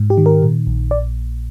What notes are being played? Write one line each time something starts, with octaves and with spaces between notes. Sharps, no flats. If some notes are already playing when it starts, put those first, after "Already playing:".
Already playing: G#2
G4
D#3
A#4
A#2
A#1
D5